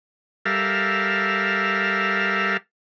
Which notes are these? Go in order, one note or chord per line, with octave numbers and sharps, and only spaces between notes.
G3 A4 A#4 E5 F5